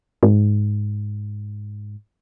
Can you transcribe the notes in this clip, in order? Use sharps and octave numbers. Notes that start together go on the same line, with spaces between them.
G#2